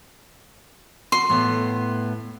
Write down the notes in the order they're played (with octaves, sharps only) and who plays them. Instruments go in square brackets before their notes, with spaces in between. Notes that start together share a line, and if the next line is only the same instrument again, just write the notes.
[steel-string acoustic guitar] F#4 [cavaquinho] C6
[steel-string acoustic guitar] A2 B3